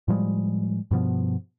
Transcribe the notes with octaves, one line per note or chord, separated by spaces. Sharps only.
A2 F3 G3 G#3
G2 B2 F3 B3